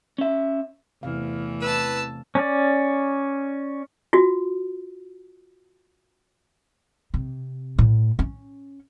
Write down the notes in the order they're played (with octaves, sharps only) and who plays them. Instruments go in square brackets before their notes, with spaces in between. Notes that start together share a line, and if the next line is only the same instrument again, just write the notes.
[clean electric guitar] C#4 E5
[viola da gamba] E2 E3 A3 [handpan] C3 C4 F5
[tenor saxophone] B4 [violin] A5 E6
[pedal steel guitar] C#4 D5
[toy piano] F4 F#4
[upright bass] C3
A2
C#4